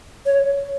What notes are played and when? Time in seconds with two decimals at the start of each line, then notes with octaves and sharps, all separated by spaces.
0.26 C#5